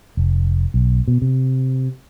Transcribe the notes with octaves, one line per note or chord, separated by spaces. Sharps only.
F1
B1
B2
C3